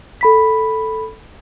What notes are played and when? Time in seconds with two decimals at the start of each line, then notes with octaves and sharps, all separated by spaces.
0.21 A4 B5 B6